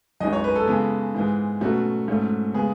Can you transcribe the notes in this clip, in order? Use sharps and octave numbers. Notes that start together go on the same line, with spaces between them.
F#2 E3 G#3 D#4 D#5
C#5
B4
A4
C#3 E3 G#3 B3
G#2 E3 G#3
B2 F#3 A3 C#4 F#4
G#2 F#3 A3 C#4
C#3 G#3 B3 G#4